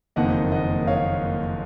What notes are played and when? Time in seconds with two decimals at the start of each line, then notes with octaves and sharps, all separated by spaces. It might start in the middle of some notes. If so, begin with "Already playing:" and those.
0.16 F#1 F2 D#3 A#3 D#5 F#5
0.52 D#5 F#5
0.87 C#5 F5